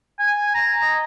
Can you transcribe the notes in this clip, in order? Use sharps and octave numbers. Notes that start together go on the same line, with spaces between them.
G#5
A#5
D#5